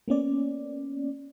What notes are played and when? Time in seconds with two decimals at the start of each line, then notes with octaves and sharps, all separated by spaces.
0.08 A#3 B3 C#4 D5